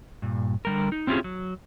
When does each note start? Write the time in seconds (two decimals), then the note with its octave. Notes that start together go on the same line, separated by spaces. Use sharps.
0.22 G2 A#2
0.65 D3 G3 A#4
0.92 D#4
1.07 C4 C#4 E4 F4 G4 G#4
1.24 F#3